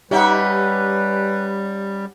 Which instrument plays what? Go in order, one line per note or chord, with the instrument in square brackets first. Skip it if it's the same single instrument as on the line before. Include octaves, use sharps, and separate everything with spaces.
[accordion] G3 [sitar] C#4 D#4 E5 [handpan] G4 F#5 [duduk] B4